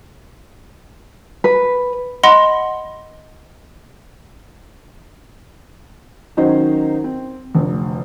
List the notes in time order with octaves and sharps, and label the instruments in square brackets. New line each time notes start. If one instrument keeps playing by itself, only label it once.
[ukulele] B4
[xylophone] D#5 F#5 B5 C6 A#6
[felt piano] D#3 F#3 C#4 D#4 C5
C4
F1 D2